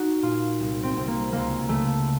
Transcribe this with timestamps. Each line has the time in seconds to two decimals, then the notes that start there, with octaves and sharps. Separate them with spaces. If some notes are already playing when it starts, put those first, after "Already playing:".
Already playing: D#4 F#4
0.22 A#2 F4
0.60 C2
0.83 C4
0.95 C2 C4
1.08 A#3
1.32 C#2 A#3
1.68 C#3 A3